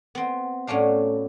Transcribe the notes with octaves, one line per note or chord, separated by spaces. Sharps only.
B3 C4
A2 F#3 C#4 D4 F5